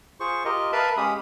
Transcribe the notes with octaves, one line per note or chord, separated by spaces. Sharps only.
F4 G#4 C5 C#6
F4 G4 A#4 D#5
A#4 B4 E5 F5 A5 B5
G#3 C#4 G4 F5 B5 D#6